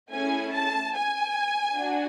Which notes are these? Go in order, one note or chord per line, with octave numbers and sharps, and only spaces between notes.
A3 C#4 E4 G#4 G#5
A5
G#5
D4 F#4